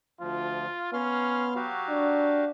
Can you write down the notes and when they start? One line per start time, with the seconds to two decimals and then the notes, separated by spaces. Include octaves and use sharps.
0.20 D2 F3 F4
0.93 B3 C#4 F5 C6 F6
1.56 F#3 F#4 G4 F5
1.89 D4